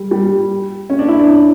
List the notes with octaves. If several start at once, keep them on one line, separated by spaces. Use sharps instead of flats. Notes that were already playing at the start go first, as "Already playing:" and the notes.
Already playing: G3
G3
C#4
D4
E4
D4